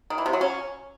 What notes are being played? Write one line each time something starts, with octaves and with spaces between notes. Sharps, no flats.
D#3
E3
C3
F#3
C#4